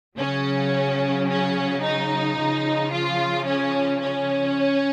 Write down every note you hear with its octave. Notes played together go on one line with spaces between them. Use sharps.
C#3 F#3 C#4
C#4
D#4
C#3 F3
F4
C#4
C#4